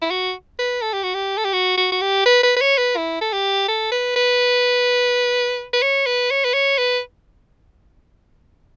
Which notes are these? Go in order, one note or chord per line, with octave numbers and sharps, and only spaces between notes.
E4
F#4
B4
A4
G4
F#4
G4
A4
G4
F#4
F#4
F#4
G4
B4
B4
B4
C#5
B4
E4
A4
G4
A4
B4
B4
B4
C#5
B4
C#5
B4
C#5
B4